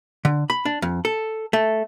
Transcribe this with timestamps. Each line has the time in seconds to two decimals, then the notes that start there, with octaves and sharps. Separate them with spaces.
0.25 D3
0.50 B5
0.65 D4
0.82 F2
1.05 A4
1.53 A3